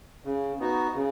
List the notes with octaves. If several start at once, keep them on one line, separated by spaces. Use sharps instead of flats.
C#3
B3 D#4 F#4
C#3